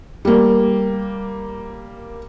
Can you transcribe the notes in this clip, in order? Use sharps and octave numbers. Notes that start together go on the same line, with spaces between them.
G3 A#3